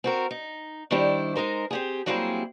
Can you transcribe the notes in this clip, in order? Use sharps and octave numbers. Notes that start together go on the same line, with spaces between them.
C4 F#4 A#4
D#4
D#3 G3 D4 E4 G4 C5
G#3 D#4 A#4 C5
C4 G4 G#4
F#3 G3 A#3 C4 E4 G#4